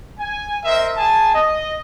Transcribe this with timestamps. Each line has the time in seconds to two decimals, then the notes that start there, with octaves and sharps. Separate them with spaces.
0.19 G#5
0.64 A#4 C5 D#5 E5
0.97 G#4 G#5 A5
1.33 D#5